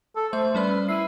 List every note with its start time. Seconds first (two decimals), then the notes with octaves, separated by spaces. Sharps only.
0.16 A4
0.33 A3 C5 E5
0.55 G3 C#4 B4 D5
0.88 E4 C7 D#7